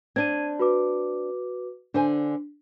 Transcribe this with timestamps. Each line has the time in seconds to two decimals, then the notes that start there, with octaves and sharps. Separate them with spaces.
0.16 C4 D4 G#6 D#7
0.59 F#4 B4 D6
1.94 D3 D4 C5 G#5